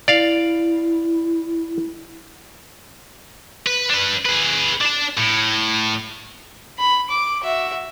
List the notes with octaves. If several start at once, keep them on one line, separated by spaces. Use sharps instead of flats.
E4 D5 F5
B4
D4 B4
G#4 B4
D4 A5
A2
B5
D6
F#4 E5